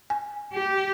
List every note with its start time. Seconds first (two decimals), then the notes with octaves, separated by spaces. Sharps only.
0.10 G#5
0.54 G4